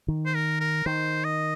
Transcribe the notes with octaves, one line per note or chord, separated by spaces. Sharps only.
D#3
C5
A#4
A#4
D#3 C5
D#5